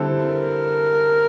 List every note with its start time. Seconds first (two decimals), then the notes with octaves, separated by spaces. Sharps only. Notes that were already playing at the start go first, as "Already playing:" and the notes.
Already playing: D3 G3 C4 E4 A4
0.25 A#4